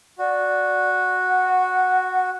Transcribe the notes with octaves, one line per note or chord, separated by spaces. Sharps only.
F#4 D5
F#5